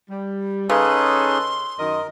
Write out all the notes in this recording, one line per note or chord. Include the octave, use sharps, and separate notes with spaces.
G3
C#3 C#4 D#4 G#4 A4 B4 C6
F#2 D#3 A#4 D#5